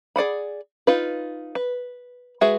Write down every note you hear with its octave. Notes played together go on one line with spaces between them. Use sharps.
G#4 D5 F#5 B5
D#4 F4 B4
B4
G#3 F#4 G#4 B4 E5